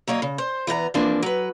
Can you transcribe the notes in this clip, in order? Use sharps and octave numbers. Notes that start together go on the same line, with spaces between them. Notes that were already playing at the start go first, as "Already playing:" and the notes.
F#3 A#3 C#5 D#5
C#3
C5
E3 B3 E5 A#5
E3 F3 G#3 A#3 C4 D4
F#3 B4